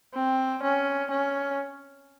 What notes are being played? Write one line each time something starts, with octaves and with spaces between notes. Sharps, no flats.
C4
C#4
C#4